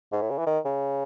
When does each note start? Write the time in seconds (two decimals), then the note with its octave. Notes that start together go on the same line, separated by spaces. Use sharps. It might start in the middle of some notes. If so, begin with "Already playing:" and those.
0.12 G#2
0.21 A2
0.30 C#3
0.38 E3
0.47 D#3
0.65 C#3